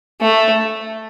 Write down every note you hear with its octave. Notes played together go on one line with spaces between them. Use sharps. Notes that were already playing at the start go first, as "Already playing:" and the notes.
A3